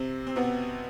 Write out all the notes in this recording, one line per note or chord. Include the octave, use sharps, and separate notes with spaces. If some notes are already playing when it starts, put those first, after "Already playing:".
Already playing: C3 C4
C4
B2 B3